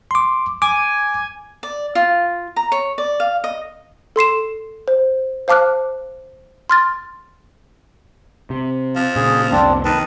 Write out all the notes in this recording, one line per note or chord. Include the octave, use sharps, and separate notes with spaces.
C6 D6
G#5 D6
D5
F4
A#5
C#5
D5
F5
D#5
A4 C6 C7 E7
C5
C5 F5 A5 D6 F6 F#6
C6 F6 A6
C3
F3
A#2 C#3 G#4
C2 F2 C3 C4 D4
D#3 B4 A5